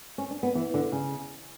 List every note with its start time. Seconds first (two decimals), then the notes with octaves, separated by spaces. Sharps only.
0.18 C#4
0.31 D4
0.43 B3
0.55 E3
0.74 D3
0.92 C#3